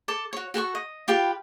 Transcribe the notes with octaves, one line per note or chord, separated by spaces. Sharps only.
A4 A5 D6
F#4 C#5
F#4 A4 F#5 C#6
D#5
F4 G4 B4 G5